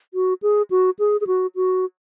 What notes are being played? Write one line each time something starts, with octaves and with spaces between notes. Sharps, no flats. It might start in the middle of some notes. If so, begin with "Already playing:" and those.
F#4
G#4
F#4
G#4
G#4
F#4
F#4